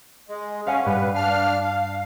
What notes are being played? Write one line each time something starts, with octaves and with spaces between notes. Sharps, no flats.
G#3
C#4 F5 F#5 G#5
G2 B4
D4 F5 F6
F5